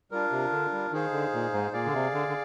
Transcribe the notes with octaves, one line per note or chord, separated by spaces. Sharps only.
G3 D4 F4 A#4
C3
D3
G3
D#3 D#4 G#4 C5 F5
D3
A#2
G#2
A#2 G#4 D5 F5
D3
C3
D3
D3